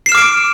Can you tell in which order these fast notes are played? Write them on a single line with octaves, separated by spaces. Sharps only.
C7 E7 F6 D6 D7